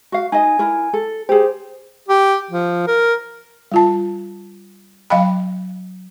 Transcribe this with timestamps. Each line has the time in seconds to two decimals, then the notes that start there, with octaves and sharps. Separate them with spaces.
0.12 F#4 F5
0.32 D#4 D#5 G#5
0.59 E4 A#4
0.93 A4
1.29 G4 G#4 C5
2.09 G4
2.51 F3
2.87 A#4
3.72 G3 F4 A5
5.10 F#3 D#5 F5 G5 B5